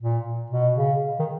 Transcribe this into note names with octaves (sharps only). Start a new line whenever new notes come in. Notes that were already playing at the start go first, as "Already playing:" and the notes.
A#2
B2
C#3
D#3